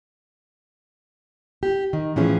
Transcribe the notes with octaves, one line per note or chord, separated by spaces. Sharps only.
G4
D#3
A2 E3 F3 C#4 G#4